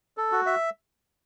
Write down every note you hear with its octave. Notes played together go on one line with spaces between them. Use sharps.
A4
F#4
E5